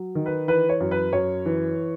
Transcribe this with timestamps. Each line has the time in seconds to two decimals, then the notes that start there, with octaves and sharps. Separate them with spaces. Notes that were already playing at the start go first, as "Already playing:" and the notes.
Already playing: F#3
0.15 D#3
0.26 B4
0.48 E3 B4
0.69 C#5
0.80 F#2
0.91 B4
1.12 F#2 C#5
1.45 E3